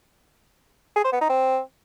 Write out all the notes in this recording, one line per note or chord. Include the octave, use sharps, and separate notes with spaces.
G#4
C5
B3
D#4
C4